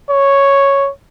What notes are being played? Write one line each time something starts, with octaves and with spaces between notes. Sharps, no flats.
C#5